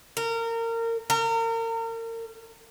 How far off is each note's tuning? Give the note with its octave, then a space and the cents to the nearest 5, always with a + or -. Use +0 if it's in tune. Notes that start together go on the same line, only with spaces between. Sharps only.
A#4 -25
A#4 -35